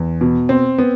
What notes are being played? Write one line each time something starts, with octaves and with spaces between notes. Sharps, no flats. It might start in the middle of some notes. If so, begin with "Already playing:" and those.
Already playing: E2
B2
C4
B3